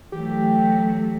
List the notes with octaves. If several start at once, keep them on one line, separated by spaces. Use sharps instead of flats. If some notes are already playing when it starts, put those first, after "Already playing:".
E3 F#3 A3 G4